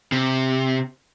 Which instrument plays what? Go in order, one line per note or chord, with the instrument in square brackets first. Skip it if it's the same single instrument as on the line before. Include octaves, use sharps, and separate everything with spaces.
[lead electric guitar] C3